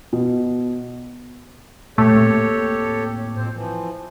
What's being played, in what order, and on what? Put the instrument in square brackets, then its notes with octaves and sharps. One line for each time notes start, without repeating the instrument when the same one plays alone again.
[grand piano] B2
[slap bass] A#2 [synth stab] A3 [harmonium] G4 A4 C#5
[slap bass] A2 A#3 C4
[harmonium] F2 C4 C5
E3 F3